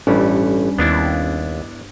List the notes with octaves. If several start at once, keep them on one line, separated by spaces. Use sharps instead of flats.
A1 G2 G3 C#4 C#5
D#2 B3 D4 E4